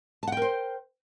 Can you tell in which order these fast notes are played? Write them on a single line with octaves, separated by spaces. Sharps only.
A5 F#5 G5 A#4 C5